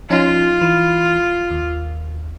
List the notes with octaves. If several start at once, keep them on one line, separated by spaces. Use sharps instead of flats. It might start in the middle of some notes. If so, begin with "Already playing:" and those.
F3 C#4 D#4 F4
E3
D#2